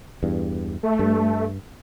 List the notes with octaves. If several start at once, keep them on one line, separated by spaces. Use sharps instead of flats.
E2 G2
A3
G2